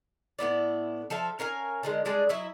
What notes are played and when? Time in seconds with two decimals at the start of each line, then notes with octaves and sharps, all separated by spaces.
0.39 A2 B3 E4 D5
1.10 F3 A4 E5 F5
1.39 C#4 A#4 F5 G#5
1.83 D3 D#3 G#3
2.05 G3 G#3 D4 G#4
2.29 F#3 E4 D#5 E5